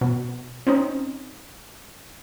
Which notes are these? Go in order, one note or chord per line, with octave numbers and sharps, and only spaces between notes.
B2
C4 C#4 D#4